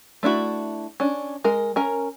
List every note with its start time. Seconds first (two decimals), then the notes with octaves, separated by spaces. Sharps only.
0.23 A3 D4 E4 F#4
1.00 C#4 D4
1.44 G#3 A#4
1.76 C#4 A#4 A#5